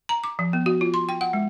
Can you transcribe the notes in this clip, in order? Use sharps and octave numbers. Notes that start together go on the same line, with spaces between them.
A#5
D6
F3
B3
F#4
F4
C6
G5
F#5
G#3